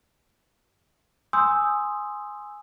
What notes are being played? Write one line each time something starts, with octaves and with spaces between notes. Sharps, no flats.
G#5 C6 D#6 E6 G6